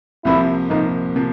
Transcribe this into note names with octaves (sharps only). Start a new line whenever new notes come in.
C2 C3 F3 A#3 E4
C2 C3 F3 A#3 D#4
C3 F3 A#3